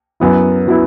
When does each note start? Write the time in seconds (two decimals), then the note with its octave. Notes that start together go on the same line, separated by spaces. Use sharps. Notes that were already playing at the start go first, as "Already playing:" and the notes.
0.20 F#2 F#3 B3 E4
0.67 F#3 B3 E4